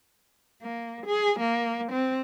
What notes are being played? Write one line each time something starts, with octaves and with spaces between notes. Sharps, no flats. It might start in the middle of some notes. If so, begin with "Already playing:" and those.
A#3
G#4
A#3
C4